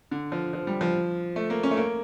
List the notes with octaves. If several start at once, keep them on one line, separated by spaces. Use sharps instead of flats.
D3
F3
F3
G3
F3
A3
A#3
C#4
A3
A#3